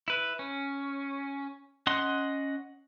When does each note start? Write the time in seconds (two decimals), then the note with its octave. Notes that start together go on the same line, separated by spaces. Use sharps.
0.08 E4 B4
0.39 C#4
1.87 C#4 D#5 F#5 C6